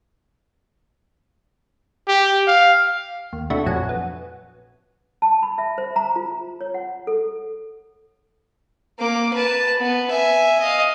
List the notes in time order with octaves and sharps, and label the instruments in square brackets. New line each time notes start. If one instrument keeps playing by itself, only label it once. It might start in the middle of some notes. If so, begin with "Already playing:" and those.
[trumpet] G4
F5
[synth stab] D#2
C3 A3 D4 E4 F#4
A#1 F2 F#3 F#5 G#5
B3
[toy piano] A5
B5
E5
C5
A#5
F4
C#5
F#5
A4
[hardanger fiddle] A#3 D6
B4 A5
B3
E5 G#5
D#5 F5